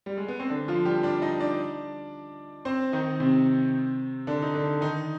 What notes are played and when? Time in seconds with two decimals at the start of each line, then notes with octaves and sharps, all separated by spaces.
0.06 G3
0.17 G#3
0.28 B3
0.40 C4
0.50 D3 D4
0.68 F3 F4
0.85 G3 G4
1.03 D4 D5
1.22 D#4 D#5
1.40 D4 D5
2.65 C4 C5
2.93 D#3 D#4
3.20 C3 C4
4.27 D3 D4
4.42 D#4
4.54 D3 D4
4.81 D#3 D#4